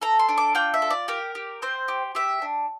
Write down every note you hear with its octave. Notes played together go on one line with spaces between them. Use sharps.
A4 A#5
C6
D4
D6
F4 G5
E5
A4
D5
G4 A#4
G4
C4 C5
G4
G4 E5
D4